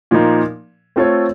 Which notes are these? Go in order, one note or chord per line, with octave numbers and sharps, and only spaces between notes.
A#2 F3 A#3 D#4
A3 C4 F4 A4 C#5